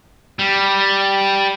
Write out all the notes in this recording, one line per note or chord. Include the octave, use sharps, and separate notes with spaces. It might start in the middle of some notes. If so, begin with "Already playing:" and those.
G3